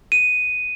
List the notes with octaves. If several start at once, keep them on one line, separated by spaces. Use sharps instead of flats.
D#7